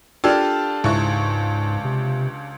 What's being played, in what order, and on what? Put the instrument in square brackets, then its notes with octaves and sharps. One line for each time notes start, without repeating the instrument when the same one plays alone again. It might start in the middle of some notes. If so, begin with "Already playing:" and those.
[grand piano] D4 G4 A4 [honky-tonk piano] F4 [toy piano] A#4 D5
[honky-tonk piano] C#2 C#6 [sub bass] G#2 [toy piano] E4 C5 E5
[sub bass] C3